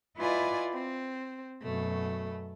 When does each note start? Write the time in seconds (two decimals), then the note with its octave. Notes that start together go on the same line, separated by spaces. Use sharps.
0.18 E4 F4 B4 D5 D#5 G#5
0.72 C4
1.62 F#2 B2 A3